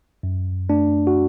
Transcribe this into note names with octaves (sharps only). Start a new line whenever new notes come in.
F#2
A3 D4
F#4